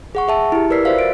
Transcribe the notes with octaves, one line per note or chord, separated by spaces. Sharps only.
G#4 F#5 C#6
G#4 E5 A5
E4 G4
A#4 B4 D5 E6 B6 C7
F4 F#4 C5 D5 E5 F5
A6 D7